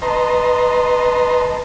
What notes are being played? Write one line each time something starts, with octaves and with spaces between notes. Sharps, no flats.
B4 D#5 A5 A#5 C6